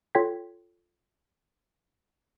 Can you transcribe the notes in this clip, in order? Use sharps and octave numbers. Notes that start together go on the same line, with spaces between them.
F4 A4 C#5 G5 G#6 B6